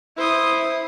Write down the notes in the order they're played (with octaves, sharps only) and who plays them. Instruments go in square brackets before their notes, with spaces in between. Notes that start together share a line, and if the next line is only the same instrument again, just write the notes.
[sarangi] E4 [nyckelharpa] C5 D#6